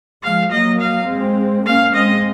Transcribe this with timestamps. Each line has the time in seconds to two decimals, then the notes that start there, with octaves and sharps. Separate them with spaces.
0.23 F3 G#3 F5
0.51 F#3 A#3 D#5
0.80 F5
1.09 G#3 C4
1.66 A#3 C#4 F5
1.94 G#3 C4 D#5